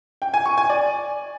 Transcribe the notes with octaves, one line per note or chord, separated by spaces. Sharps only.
G5
G#5
C#6
G#5
D5